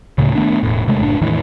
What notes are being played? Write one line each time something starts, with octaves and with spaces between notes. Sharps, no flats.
D2 A2 C#3
D#3 A3 B3 D4
E1 A2
C3 G#3 A3
F#1 A2 D4
E2 A2 D#3 E3